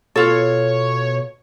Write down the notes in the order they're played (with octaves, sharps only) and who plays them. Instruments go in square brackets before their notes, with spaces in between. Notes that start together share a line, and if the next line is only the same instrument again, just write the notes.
[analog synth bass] B2 [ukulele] F4 A4 [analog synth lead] C#5